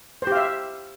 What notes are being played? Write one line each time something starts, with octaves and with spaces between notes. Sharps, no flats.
G4 C5 E5 F5